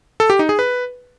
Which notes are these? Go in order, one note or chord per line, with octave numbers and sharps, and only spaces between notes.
A4
G4
D#4
G#4
B4